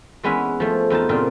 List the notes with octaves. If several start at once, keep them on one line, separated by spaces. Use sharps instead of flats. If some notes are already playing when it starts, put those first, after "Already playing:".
E3 G#3 B3 C#4 B4 E5
F3 A3
E2 D#4 F4 A5
A#2 C#3 C4 D4 F4